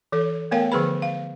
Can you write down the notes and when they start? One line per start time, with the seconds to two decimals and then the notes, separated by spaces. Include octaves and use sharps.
0.12 E3 A4 C#5
0.51 A3 B3 A#4 C#5 F5 G5
0.72 D3 F3 G#4 B4 B5
1.02 F5